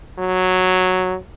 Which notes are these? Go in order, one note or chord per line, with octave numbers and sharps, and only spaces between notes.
F#3